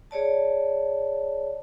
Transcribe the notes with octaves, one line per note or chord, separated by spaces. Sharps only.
G#4 C#5 D5 A5